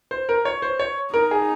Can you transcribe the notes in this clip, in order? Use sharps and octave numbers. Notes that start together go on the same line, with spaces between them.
C5
A#4
C#5
C5
C#5
D#4 A#4
G#4